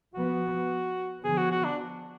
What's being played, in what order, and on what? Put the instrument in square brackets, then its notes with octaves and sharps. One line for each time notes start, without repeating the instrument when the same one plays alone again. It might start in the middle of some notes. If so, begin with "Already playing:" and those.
[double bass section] F3 B3 [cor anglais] F#4
[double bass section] D3 F3 B3 [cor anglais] G#4
[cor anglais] F#4
F#4
D4